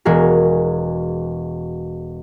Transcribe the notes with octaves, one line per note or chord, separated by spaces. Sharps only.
E1 F#4 G#4 A#4